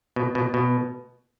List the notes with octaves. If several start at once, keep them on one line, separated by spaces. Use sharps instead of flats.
B2
B2
B2